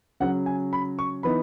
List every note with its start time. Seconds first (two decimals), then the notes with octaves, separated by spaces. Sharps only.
0.20 C#3 F#3 C#4 F#5
0.46 G#5
0.73 B5
0.99 C#6
1.23 E3 B3 D#4 B5